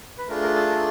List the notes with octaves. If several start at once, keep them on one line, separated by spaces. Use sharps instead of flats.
B4
A3 D4 F4 G#4 A#4
A#4
A4
A#4